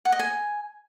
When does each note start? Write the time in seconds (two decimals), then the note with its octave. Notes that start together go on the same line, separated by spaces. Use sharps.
0.05 F#5
0.12 D#5
0.19 G#5